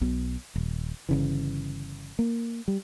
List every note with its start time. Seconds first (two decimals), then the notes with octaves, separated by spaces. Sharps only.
0.01 B1 B2
0.56 D#1
1.09 G1 C#3 E3
2.19 A#3
2.68 G3